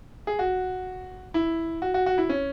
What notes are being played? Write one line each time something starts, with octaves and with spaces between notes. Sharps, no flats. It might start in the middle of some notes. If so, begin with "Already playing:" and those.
G#4
F#4
E4
F#4
F#4
F#4
E4
C#4